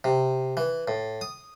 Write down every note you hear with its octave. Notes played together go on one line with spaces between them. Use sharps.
C3
E3
A2
D#6